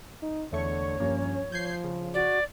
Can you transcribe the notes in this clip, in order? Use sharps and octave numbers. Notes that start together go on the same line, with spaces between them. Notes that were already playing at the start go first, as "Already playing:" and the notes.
D#4
E2 D3 A3 C#5 C#6
G2 F3 A#3 C#4
F3 G6 G#6 C7
C#3
F#4 D5